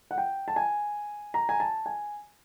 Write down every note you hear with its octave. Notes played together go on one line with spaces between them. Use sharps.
F#5
G5
A5
G#5
A#5
G#5
A5
G#5